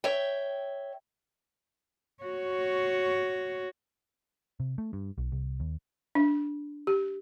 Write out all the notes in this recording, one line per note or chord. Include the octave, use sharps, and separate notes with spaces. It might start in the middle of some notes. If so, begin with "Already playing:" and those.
C#5 E5 G5
F#4 C#5
C3
A3
G2
B1
C2
D#2
D4
G4